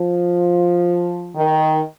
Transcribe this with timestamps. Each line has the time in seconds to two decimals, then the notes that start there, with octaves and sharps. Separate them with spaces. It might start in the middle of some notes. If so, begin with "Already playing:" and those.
Already playing: F3
1.35 D#3